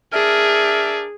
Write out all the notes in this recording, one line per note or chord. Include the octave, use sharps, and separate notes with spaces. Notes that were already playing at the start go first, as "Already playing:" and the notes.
D4 G#4 A#4 E5